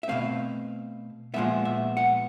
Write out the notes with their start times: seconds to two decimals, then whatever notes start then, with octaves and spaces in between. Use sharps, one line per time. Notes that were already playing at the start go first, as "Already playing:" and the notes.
0.03 E5
0.08 B2 F#3 A3 C4 F5
1.34 A#2 F3 G#3 B3 E5
1.65 E5
1.97 F#5